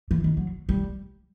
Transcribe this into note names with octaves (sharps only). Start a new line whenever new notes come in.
E3
D#3
F#3
G3